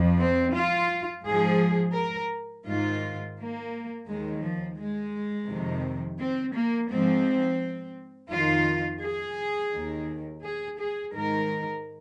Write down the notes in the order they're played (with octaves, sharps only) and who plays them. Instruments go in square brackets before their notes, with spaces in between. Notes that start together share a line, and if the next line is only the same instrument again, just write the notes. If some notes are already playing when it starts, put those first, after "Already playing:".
Already playing: [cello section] F2 F3
C4
F4
G#2 F3 G#4
A#4
G#2 D#3 F4
A#3
D#2 D#3 G#3
F3
G#3
F2 C3 D#3
C4
A#3
G#2 F3 C4
F2 D#3 F4
G#4
D#2 D#3
G#4
G#4
G#2 D#3 A#4